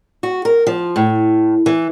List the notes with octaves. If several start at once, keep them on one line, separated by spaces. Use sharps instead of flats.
F#4
A#4
F3
A2
E3